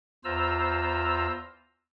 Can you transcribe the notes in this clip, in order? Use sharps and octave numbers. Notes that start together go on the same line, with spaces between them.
E2 F4 C5 A#5 E6